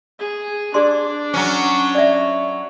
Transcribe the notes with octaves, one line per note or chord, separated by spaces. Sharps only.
G#4
D4 G#4 D5 C6
F#3 C#4
D5 E5